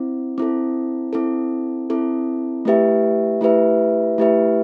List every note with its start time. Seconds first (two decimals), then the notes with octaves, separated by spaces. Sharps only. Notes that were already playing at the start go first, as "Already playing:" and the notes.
Already playing: C4 E4
0.38 C4 E4 A4
1.13 C4 E4 A4
1.90 C4 E4 A4
2.65 A3 E4 G4 B4 E5
3.41 A3 E4 G4 B4 E5
4.18 A3 E4 G4 B4 E5